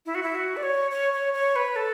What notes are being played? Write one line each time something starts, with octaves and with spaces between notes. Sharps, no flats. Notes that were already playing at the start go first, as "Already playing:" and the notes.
E4
F#4
E4
F#4
D5
C#5
C#5
C#5
C#5
B4
A4